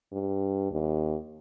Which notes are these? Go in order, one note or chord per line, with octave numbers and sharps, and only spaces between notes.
G2
D#2